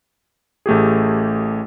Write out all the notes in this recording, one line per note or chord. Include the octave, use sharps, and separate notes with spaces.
A1 A3 G4 G#4